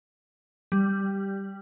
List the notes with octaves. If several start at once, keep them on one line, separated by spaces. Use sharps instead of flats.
G3